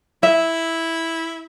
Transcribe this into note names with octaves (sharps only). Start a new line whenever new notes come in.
E4 E5